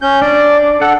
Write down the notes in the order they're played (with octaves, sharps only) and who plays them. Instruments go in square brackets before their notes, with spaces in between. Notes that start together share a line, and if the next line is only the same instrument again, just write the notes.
[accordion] C#4 G6
[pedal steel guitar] D4 [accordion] D5
[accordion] A4 [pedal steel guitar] F#5